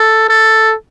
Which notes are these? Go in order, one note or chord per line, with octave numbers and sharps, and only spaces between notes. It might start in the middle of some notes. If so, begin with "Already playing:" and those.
Already playing: A4
A4